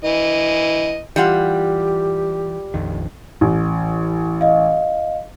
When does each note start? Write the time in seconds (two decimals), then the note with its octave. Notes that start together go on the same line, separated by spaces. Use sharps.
0.05 E3 D#5
1.16 E3 G3 F4 G4 F#5
2.74 A#1 F2 D#3
3.41 A1
4.41 D#5 F5